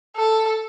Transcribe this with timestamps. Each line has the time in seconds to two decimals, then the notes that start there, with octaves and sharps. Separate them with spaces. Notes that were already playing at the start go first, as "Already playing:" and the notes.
0.16 A4